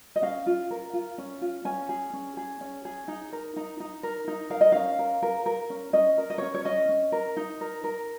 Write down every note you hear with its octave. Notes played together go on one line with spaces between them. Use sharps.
D#5
C#4 F5
F4
A#4
F4
C#4
F4
C#4 G#5
G#4
C#4
G#4
C#4
G#4
D#4
A#4
D#4
D#4
A#4
D#4
A#4 F5
D#5
C#4 F5
A#4
A#4
A#4
C#4
C#4 D#5
A#4
D#5
C#5
C#4
C#5
C#4 D#5
C#4
A#4
D#4
A#4
A#4